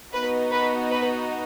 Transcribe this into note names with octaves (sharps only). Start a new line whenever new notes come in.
B3 D#4 F#4 B4
B4
B4